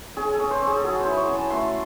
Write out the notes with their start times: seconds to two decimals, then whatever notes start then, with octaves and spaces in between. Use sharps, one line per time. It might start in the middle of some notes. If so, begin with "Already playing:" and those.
0.17 C#4 G#4
0.34 A4
0.40 C#4
0.51 C5
0.62 C#4
0.67 G#4
0.77 A4
0.84 F#3 G#4
1.00 C5
1.06 E4
1.17 C#5
1.28 C#4
1.35 A5
1.51 A3 C6